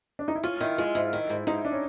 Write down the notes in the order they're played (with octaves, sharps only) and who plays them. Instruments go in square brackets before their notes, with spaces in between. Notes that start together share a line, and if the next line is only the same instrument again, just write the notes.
[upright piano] D4
D#4
E4
[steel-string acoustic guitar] C#4 [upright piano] F4
[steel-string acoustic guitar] D#3 [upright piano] E4
[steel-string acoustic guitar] G#3 [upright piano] F4
[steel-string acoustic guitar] G#2 [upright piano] E4
[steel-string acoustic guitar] D#3
G#2
[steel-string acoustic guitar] G#2 [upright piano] D#4
[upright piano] D4
C#4